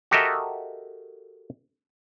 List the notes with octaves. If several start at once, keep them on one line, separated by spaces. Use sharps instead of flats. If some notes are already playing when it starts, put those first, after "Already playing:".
F#4 G4 A4 A#4 D#5 E5